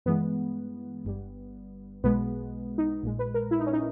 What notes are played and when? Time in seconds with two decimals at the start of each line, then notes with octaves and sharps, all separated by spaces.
0.06 G2 E3 G#3 B3
1.04 G1 G2 G3
2.03 B1 B2 G#3 B3
2.78 D#4
3.02 A#1 A#2 G#3
3.19 B4
3.34 A#4
3.51 E4
3.60 D#4
3.66 C#4
3.73 D#4